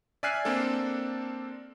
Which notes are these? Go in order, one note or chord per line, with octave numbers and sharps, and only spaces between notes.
D5 E5 G#5 F6 F#6 C7
A#3 C4 D4 A4